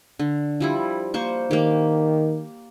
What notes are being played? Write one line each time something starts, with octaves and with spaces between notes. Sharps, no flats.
D3
F3 G3 E4
A#3 C5 C#6
D#3 A#3 G4